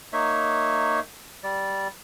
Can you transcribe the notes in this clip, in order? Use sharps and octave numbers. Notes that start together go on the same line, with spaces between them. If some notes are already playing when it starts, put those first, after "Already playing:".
A#3 D#4 C#5 E5
G3 D5